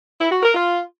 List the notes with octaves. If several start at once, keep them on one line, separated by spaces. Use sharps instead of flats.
E4
F#4
A#4
F4